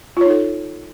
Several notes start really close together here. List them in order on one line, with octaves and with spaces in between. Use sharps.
F4 C#5 D#4 A4